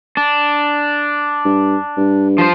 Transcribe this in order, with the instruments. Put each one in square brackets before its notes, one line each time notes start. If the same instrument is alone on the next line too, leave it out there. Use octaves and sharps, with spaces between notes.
[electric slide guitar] D4
[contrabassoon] G2
G2
[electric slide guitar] F3 C5